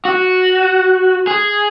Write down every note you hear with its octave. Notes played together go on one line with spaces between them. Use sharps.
F#4
G#4